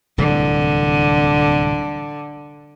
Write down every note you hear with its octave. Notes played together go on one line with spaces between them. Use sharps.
D1 C2 D3 E3